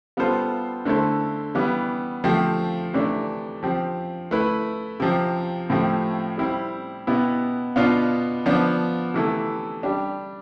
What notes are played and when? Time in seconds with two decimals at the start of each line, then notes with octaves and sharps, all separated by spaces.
0.17 G3 B3 F4 A4 C5
0.85 D3 A3 E4 A4 C5
1.55 E3 G3 B3
2.24 F3 A3 C4 G4
2.94 C3 E3 A3 D4
3.63 F3 C4 G4
4.31 A3 E4 B4
5.00 C3 F3 C4 G4
5.70 A2 F3 A3 C4 G4
6.38 G3 C4 E4 G4
7.07 B2 B3 E4 G4
7.76 B2 B3 D4 F4
8.46 F3 B3 D4
9.14 C3 E3 A3 E4 A4
9.83 G3 D4 G4